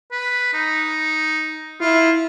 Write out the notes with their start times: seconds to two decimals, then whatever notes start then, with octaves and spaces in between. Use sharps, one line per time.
0.12 B4
0.54 D#4
1.81 E4 F4